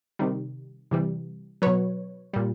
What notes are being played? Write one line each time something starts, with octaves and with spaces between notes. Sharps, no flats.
C3 D#3 G3
C3 E3 G3
B2 F#3 B4 C#5
A#2 G3